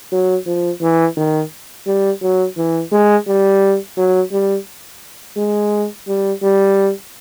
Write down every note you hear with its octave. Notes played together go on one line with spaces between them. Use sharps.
F#3
F3
E3
D#3
G3
F#3
E3
G#3
G3
F#3
G3
G#3
G3
G3